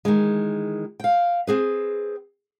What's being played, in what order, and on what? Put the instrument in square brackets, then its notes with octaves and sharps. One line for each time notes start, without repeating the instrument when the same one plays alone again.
[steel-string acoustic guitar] D#3 E3 G#3
F5 G5
C4 G#4 B4